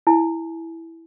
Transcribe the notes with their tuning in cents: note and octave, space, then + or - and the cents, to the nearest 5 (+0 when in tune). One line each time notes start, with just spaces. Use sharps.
E4 +0 G#5 +30